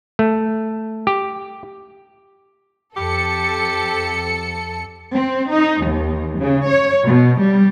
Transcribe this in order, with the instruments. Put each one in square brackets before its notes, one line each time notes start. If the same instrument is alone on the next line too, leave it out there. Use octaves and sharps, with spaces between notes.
[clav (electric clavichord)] A3
G4
[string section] F2 A4 C#7 [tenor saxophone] G4
[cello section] C4
D#4
D#2
C#3
C#5
B2
G3